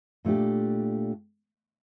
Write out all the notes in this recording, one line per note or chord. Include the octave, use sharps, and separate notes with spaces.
A#2 A3 D4 G4